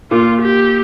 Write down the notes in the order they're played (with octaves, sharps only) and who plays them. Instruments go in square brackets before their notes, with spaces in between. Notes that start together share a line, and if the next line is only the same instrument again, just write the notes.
[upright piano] A#2 [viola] F4
[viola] G4